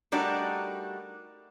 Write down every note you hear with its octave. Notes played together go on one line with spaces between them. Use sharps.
G3 A3 D4 D#4 F#4 A#4